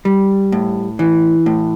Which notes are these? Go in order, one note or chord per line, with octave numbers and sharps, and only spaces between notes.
G3
A2
E3
A2